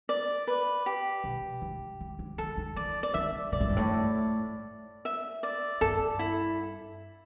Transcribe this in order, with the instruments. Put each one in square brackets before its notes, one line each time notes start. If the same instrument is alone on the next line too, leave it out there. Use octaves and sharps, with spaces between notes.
[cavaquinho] D5
B4
G4
[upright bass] B2
D3
E3
D3
[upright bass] D3 [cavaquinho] A4
[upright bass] D3
[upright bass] E3 [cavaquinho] D5
[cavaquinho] D5
[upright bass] D3 [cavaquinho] E5
[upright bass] B2 [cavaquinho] D5
[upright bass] A2
G2
A2
[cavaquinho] E5
D5
[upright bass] G2 [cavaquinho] A4
[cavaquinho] E4